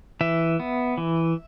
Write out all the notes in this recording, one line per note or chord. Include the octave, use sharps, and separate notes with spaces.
E3 E5
B3
E3